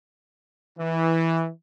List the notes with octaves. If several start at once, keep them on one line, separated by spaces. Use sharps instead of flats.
E3